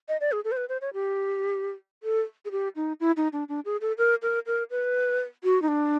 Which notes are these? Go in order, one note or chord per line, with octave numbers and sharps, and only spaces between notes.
D#5
D5
G#4
A4
C5
B4
C5
C#5
G4
A4
G#4
G4
D#4
E4
D#4
D4
D4
G#4
A4
A#4
A#4
A#4
B4
F#4
D#4
D4